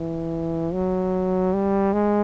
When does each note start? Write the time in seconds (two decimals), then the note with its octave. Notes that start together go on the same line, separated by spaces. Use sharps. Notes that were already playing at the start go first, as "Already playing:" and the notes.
Already playing: E3
0.73 F#3
1.54 G3
1.93 G#3